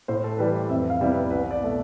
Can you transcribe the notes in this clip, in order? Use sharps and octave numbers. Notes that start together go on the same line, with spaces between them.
A2 C5
A4
E3 G3 B4
D5
F2 E5
F5
C3 G3 B3 E4
B4
C2 B4
D5
B2 A3